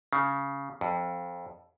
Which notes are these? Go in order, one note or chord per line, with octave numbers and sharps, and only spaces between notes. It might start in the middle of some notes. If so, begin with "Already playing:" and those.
C#3
F2